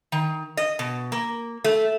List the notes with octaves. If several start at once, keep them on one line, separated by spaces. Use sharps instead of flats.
D#3
D#5
B2
A#3
A3